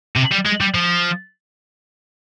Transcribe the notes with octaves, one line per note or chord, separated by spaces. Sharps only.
C3
G3
G#3
G3
F3